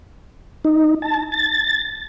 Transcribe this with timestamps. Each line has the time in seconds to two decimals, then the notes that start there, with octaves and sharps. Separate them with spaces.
0.65 D#4
1.02 A5
1.32 A6